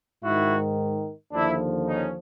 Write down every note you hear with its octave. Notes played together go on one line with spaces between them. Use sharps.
G#2 D#3 E4 F#4
D#2 D3 F3 D4 E4
C#4 D#4